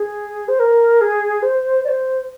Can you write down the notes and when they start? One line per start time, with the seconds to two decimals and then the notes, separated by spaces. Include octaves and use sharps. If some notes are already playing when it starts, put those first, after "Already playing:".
Already playing: G#4
0.48 C5
0.59 A#4
1.01 G#4
1.42 C5
1.84 D5
1.89 C5